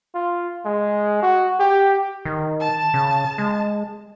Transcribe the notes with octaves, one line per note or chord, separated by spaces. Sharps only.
F4
G#3
F#4
G4
D#3
A5
C#3
G#3